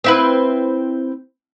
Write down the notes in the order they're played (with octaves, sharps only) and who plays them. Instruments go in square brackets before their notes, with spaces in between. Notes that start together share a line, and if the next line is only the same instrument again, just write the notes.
[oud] C4 E4 B4